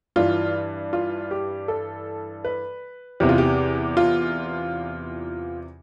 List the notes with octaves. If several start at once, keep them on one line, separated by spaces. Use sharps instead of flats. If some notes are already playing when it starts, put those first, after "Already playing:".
G2 E3 F4
F4
G4
A4
B4
E2 C3 E3 G4
F4
G4
F4